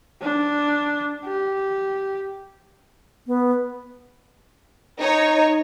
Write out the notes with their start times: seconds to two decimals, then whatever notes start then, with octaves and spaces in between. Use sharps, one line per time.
0.22 D4
1.25 G4
3.27 B3
5.01 D#4 C#5